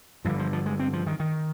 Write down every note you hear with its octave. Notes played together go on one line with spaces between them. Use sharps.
G2 D3 F3
F3
F3
G#3
C4
F3
D#3
D#3